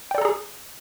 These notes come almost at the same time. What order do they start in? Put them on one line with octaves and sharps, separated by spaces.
G5 D5 A4 A#5 G#4